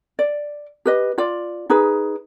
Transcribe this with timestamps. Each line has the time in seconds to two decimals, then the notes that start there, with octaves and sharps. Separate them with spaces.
0.19 D5
0.85 G4 B4 D#5
1.18 F4 D5
1.70 D#4 G#4 B4